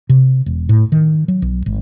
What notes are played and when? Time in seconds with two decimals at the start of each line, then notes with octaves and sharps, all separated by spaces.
0.09 C3
0.46 E1
0.69 A2
0.92 D#3
1.28 F#3
1.42 B1
1.66 G#1